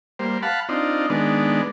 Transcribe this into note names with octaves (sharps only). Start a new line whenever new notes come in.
G3 A#3 C5
F5 F#5 A5 B5
C4 D4 D#4 F4
D#3 G#3 B3 D4